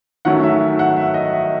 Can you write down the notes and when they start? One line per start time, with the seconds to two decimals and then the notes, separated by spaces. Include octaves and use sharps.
0.25 D#3 F#3 A3 C#4 F#5
0.43 E5
0.79 F#5
0.97 E5
1.14 D#5
1.33 E5